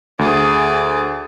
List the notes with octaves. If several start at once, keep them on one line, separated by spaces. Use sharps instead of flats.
D2 G#4 D5